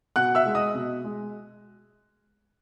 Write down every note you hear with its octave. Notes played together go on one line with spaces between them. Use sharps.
B2 F#5 F#6
E5 E6
G#3
D#5 D#6
B2
G#3